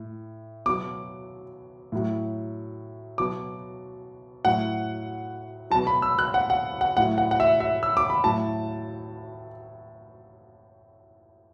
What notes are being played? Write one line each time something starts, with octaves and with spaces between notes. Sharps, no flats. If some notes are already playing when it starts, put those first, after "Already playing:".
Already playing: A2
B2 F#3 D6
A2 F#3
B2 F#3 D6
A2 F#3 F#5
B2 F#3 A5
B5
E6
F#6
F#5
F#5
F#5
A2 F#3 F#5
F#5
F#5
E5
E5
E6
D6
B5
A2 F#3 A5